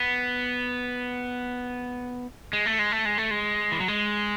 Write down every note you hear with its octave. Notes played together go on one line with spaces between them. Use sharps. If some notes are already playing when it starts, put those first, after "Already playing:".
Already playing: B3
G#3
A3
G#3
A3
G#3
A3
G#3
E3
F#3
G#3